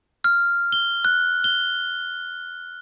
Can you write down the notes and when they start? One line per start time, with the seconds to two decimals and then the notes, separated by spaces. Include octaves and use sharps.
0.24 F6
0.72 G7
1.05 F#6
1.44 G7